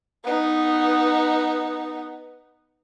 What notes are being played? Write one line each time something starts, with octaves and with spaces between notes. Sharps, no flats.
B3 D#4